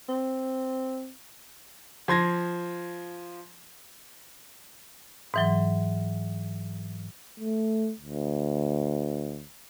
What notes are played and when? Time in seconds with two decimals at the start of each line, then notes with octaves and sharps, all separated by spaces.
0.09 C4
2.08 F3 C6 G#6 A#6
5.34 G#2 E3 F#3
7.40 A3
7.99 D2